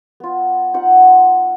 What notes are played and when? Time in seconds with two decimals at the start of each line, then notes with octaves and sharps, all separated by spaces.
0.20 B3 F4
0.74 D#4 F4 F#5